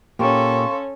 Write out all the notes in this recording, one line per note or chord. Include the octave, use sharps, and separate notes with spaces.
A#2 A#3 C#4 G4 A4 F5 C6 C#6